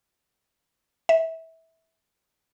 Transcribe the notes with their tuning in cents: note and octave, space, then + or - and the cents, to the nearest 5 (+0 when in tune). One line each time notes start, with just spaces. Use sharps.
E5 -20